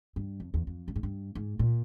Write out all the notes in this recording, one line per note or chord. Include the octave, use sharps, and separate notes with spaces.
G2
F2
E2
F2
G2
G#2
G2
G#2
A#2